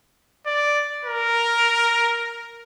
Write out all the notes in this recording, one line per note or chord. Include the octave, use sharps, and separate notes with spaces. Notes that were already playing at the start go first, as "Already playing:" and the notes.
D5
A#4